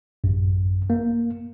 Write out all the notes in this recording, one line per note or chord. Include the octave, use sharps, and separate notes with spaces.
A1 F#2
A#3